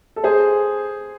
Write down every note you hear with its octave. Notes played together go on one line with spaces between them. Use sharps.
A4
G#4 C5